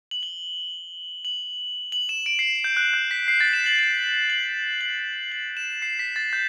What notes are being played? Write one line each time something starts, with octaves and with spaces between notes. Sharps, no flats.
F#7
G7
F#7
F#7
E7
D7
C7
G6
F#6
G6
B6
C7
A6
E7
F#7
E7
F#7
F#7
F#7
E7
C7
B6
A6
G6